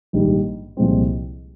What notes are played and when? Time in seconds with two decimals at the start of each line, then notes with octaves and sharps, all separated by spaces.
0.13 A#1 G#2 D#3 G3
0.77 C2 A#2 F3 G#3 C4